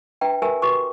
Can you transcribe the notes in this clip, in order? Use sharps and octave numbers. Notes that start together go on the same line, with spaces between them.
D4 B4 E5 G5 A#5
G4 A#4 B4 E5 G#5 A#5
F#4 G4 B4 C#6 D6